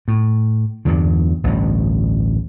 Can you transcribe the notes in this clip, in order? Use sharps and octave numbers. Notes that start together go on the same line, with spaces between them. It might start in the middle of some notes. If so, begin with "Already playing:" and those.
A2
E2 G2 D3
A1 D2 G2